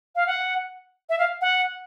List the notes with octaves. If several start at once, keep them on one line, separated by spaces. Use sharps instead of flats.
F5
F#5
E5
F5
F#5